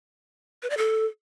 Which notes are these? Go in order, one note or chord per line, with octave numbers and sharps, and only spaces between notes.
B4
D5
A4